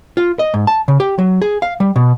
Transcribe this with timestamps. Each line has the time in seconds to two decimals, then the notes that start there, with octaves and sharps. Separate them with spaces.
0.17 F4
0.39 D#5
0.54 G#2
0.67 A5
0.88 C#3
1.00 G4
1.19 F#3
1.42 G#4
1.62 F5
1.80 G3
1.96 B2